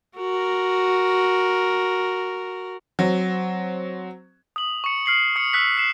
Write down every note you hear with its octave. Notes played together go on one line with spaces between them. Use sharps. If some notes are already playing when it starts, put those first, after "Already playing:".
F#4 A#4
F#3 C4
D#6 F#7
C#6 C#7
F6 C7 F#7
D#6 C#7
E6 F#6 B6
C7 E7